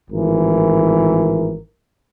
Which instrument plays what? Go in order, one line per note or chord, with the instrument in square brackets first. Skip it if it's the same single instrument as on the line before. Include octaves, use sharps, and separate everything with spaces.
[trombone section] G#1 A2 E3 A#4